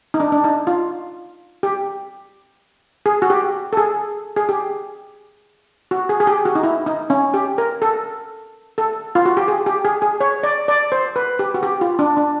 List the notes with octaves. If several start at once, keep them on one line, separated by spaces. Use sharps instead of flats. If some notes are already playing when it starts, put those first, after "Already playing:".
D#4
D4
D4
D#4
F4
G4
G#4
F#4
G4
A4
G#4
G#4
G4
F#4
G#4
G#4
G4
F#4
D#4
E4
D#4
C#4
G4
A#4
A4
A4
F4
F#4
G4
G#4
G4
G#4
G#4
C#5
D5
D5
C5
B4
G4
F#4
G4
F4
D4
D4